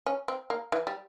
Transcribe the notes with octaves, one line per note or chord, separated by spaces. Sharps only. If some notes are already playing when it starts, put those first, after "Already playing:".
C#4
C4
A#3
E3
G3